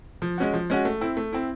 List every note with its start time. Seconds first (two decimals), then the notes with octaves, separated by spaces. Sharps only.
0.22 F3
0.38 G#3 C#4 F#4
0.53 F3
0.70 G#3 C#4 F#4
0.85 A3
1.01 C4 E4
1.17 A3
1.33 C4 E4